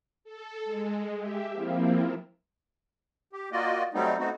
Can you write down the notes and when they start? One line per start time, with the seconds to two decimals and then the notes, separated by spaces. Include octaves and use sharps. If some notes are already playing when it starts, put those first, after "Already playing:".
0.24 A4
0.65 G#3
1.17 G4 E5
1.51 F3 A#3 C4 E4 F4
3.33 G4
3.52 A#3 F4 F#4 D5 D#5
3.94 F#3 G3 A3 B3 C4 D#4
4.19 A3 B3 C4 D#4 F#4